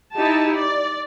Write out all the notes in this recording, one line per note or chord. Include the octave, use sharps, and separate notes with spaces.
D#4 E4 G4 A5
D5